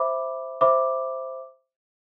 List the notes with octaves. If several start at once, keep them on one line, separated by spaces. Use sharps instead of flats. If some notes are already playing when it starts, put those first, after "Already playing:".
Already playing: C5 E5 B5 D6
C5 E5 B5 D6